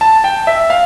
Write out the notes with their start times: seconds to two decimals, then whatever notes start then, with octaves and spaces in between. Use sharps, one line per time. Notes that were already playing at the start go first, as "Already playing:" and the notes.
0.01 A5
0.24 G5
0.47 E5
0.70 F5